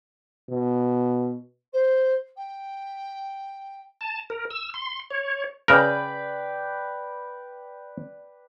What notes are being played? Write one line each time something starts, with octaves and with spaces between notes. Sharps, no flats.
B2
C5
G5
A5
A#4
E6
C6
C#5
C#3 A#4 B4 D5 G5